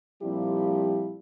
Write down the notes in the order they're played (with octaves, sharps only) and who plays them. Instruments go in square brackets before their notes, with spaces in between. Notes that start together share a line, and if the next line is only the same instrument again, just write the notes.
[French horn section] A#2 F3 G3 C4 E4 G4